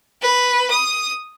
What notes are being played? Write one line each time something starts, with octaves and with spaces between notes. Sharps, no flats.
B4
D#6